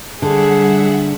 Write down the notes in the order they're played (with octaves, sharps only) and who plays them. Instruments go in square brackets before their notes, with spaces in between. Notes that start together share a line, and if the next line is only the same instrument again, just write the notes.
[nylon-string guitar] D3 [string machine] G3 E5 F#5 [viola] G#4